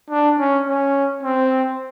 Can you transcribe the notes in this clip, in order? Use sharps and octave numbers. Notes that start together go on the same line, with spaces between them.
D4
C#4
C#4
C4